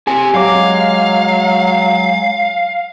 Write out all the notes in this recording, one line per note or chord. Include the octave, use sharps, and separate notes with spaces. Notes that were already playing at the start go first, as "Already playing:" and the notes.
C4 G4 G#5
F#3 G#3 F5 D6